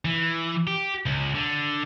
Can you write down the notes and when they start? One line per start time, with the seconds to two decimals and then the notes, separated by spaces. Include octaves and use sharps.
0.05 E3
0.67 G4
1.06 C#2
1.35 D3